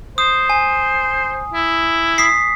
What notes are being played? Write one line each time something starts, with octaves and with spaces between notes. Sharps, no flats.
C5 D#6
G#5
E4
D#6 B6 C7